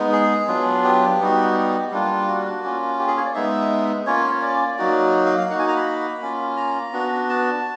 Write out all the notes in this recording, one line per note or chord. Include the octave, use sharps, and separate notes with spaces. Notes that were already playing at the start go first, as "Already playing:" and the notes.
Already playing: G#3 B3 D#4
G#4
F#3 B3 D4 F4
G4
G3 B3 D#4 F#4
G3 A#3 D4 F4
F#4
A#3 C#4 F4
G4
G#4
C#5
D5
G#3 B3 D#4 E5
A#3 C#4 F4 C#5
D5
F#3 A#3 D#4 F#4
F5
F5
A#3 D#4 F#4 F#5
G#5
A#5
B5
A#3 C#4 F4
A#5
B3 D4 F#4
A5